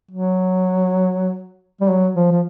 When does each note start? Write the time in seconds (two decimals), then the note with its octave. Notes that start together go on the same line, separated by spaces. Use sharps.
0.11 F#3
1.81 G3
1.90 F#3
2.15 F3
2.32 F3